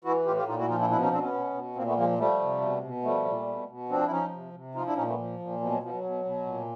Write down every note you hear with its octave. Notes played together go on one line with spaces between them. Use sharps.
E3 E4 F#4
A2 F4 G4
F4 G4
A#2 D#4 F4
E4 F#4
F3 D#4 F4
D4 E4
B2 D4 E4
C#4 D#4
B2 C4 D4
B3 C#4
B2
B2
A#2 A#3 C4
A3 B3
F3 G#3 A#3
F3 G3 A3
C3
B2
B2
F3 G3 A3
A#2
B2
B2
F3 C4 D4
E4
F3 C#4 D#4
C3
C3
F3 D#4 F4
D4 E4
A#2 C#4 D#4
A3 B3
F3
A#2
B2 F3
F#3
B2 F3
F#3
B2
B2
A#2